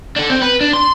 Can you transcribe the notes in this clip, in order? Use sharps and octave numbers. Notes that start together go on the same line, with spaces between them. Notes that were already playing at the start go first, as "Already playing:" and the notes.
D4 A4
C4
B4
D4
C6